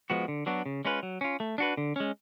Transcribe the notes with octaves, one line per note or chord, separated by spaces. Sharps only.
F3 G#3 B3 F#4
D3
F#3 B3 D4 F#4
C#3
G#3 C#4 F4 B4
F#3
C#4 F4
A3
D4 F#4 B4
D3
G#3 C#4